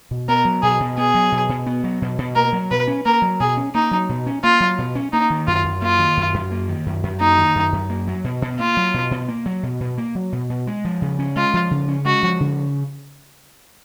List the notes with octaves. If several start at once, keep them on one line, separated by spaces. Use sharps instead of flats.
B2
B3 A#4
F#3
B2 G#4
B2
B3 G#4
F#3
B2
B2
B3
F#3
B2
B2
A#3 A#4
F#3
B2 B4
C#4
A#3 A#4
F#3
B2 G#4
C#4
A#3 D#4
F#3
B2
C#4
A#3 F4
F#3
B2
C#4
A#3 D#4
D#3
F#2 F4
F#2
A#3 F4
D#3
F#2
F#2
A#3
D#3
F#2
F#2
A#3 D#4
D#3
F#2
F#2
A#3
F#3
B2
B2
A#3 F4
F#3
B2
B2
A#3
F#3
B2
B2
A#3
F#3
B2
B2
G#3
F3
C#3
C#4
G#3 F4
F3
C#3
C#4
G#3 F#4
F3
C#3